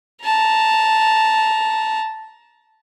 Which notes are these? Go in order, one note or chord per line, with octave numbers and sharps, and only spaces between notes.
A5 A#5